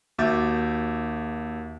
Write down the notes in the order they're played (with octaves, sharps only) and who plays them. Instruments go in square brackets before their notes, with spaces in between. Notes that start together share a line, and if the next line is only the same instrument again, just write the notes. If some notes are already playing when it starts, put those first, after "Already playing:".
[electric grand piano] D#2 F#4 E5 D6 G6 A6